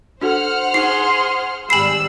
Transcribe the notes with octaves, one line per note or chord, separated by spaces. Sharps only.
D4 F#4 A4 C5 F#5 F6
D#4 G#4 C6 C7
G#1 G3 G5 G#5 B5 E6 C7 F#7